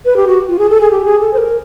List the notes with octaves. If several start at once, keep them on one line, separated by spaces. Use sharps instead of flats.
B4
G4
F#4
F4
G#4
A4
G#4
G4
G#4
A4
C5
A#4